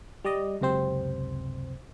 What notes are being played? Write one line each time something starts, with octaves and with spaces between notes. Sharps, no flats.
G3 D5 D#5
C#2 F#2 C3 C4 C5